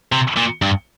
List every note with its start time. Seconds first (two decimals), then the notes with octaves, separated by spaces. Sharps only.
0.12 C3
0.36 A#2
0.62 G2